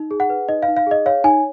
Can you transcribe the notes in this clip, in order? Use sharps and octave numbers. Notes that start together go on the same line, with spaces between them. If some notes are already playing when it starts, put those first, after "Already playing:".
Already playing: D#4
G#4
F#5
B4
D#4 D#5
F5
D#4
F5
G#4 D#5
C#5 F5
D#4 G#5